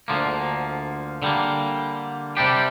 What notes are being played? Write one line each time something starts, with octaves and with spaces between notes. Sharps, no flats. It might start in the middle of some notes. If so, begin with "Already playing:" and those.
D2 D3 F3 A#3
D3 G3 A#3
C3 G3 D4 G4